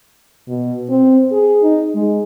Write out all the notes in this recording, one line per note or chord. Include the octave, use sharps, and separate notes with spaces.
B2
C4
G#4
D#4
G#3